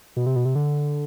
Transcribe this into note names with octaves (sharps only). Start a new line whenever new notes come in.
B2
C3
B2
C3
D3